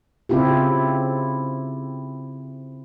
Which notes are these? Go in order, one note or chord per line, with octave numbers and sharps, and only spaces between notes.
C#3 C4 E4 F4 G4